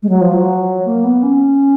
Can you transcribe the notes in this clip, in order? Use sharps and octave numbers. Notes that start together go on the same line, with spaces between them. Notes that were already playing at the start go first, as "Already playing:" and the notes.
G#3
F#3
F3
F#3
A#3
B3
C#4